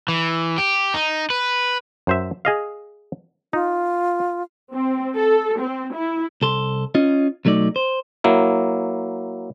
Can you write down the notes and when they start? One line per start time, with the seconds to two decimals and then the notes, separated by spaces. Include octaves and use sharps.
0.08 E3
0.58 G4
0.94 D#4
1.30 B4
2.07 F#2 C5 E5
2.45 G#4 D#5 F5
3.53 D#4 F4
4.74 C4
5.15 A4
5.60 C4
5.93 E4
6.42 C2 A4 C6
6.95 C#4 F4 D#5
7.45 B1 F#3 A3 D#4 D5
7.76 C5
8.24 F#3 A#3 E4